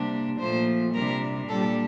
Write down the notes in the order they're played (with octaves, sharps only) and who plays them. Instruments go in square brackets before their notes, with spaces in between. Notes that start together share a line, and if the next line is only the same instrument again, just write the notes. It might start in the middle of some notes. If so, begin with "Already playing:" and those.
Already playing: [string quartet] C3 G3 A#3 D4
A#2 F3 A3 C5
C3 G3 D4 A#4
A#2 G3 D4 A4